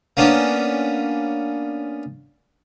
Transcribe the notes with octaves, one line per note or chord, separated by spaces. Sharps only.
A#3 B3 C#4 D4